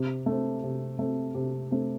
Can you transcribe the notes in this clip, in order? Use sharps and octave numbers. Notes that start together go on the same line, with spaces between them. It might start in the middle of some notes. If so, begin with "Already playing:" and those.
Already playing: C3
A3
C4
C3
A3 C4
C3
A3 C4